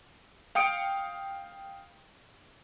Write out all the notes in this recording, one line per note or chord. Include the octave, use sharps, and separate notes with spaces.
F5 G5 D#6 C#7 D7